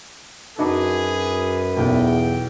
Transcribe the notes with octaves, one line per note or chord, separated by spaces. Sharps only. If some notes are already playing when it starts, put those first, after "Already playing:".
F#2 D4 D#4 F#4 G#4 B4
B1 E2 G5